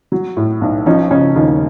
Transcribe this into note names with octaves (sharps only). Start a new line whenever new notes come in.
F#3
A2
B1
F3 C#4 D#4
C#3 C#4 D#4
D#2 D#4 F4